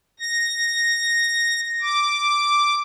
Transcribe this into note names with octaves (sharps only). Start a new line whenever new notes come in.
A#6
D6